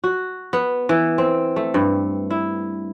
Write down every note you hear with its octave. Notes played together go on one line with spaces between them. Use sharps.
F#4
B3
E3
C4
A3
G2
E4